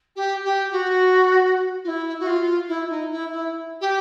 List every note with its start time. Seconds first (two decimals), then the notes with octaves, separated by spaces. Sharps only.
0.16 G4
0.45 G4
0.72 F#4
1.84 F4
1.88 E4
2.20 F#4
2.27 F4
2.68 E4
2.89 D#4
3.11 E4
3.32 E4
3.81 G4